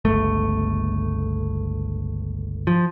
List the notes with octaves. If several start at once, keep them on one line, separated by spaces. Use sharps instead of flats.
G1 C#2 A3
F3